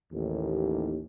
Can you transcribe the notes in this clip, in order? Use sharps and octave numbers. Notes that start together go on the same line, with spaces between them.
A1 D#2